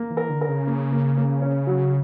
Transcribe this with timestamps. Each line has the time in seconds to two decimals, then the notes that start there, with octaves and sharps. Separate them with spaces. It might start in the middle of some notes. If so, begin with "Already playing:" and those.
Already playing: A#3
0.10 E3
0.17 A#4
0.29 D3
0.41 A#4
0.48 C#3
0.67 A#3
0.92 A#3
1.17 A#3
1.42 C#4
1.67 F#3